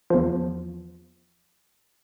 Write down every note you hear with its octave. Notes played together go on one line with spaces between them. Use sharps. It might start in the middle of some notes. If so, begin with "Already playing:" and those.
E2 F3